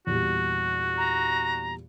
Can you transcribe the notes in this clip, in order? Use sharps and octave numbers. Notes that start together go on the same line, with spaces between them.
E2 A#2 G3 F#4
A#5